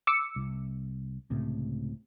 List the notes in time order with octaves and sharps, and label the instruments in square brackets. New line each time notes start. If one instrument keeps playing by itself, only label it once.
[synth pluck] D6 E6 C#7
[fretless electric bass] C2
C#2 A2 C3